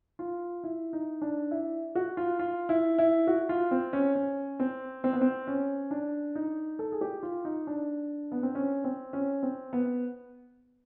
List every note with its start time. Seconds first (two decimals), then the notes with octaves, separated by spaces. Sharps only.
0.19 F4
0.64 E4
0.93 D#4
1.22 D4
1.51 E4
1.95 F#4
2.17 F4
2.39 F4
2.69 E4
2.98 E4
3.27 F#4
3.49 F4
3.71 C4
3.93 C#4
4.15 C#4
4.60 C4
5.04 C4
5.13 B3
5.21 C4
5.47 C#4
5.91 D4
6.35 D#4
6.79 A4
6.92 G#4
7.01 G4
7.23 F4
7.45 D#4
7.67 D4
8.32 B3
8.43 C4
8.55 C#4
8.84 C4
9.13 C#4
9.43 C4
9.73 B3